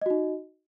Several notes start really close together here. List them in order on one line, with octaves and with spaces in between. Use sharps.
D#5 F#4 D#4